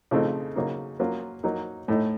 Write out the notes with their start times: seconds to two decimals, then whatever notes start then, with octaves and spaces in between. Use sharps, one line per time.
0.11 C#3 F3 A3 C4 D#4
0.55 C#3 F#3 A#3 D#4
1.00 F#3 A#3 C#4 F4
1.43 F#3 A#3 D#4
1.88 A2 A3 D#4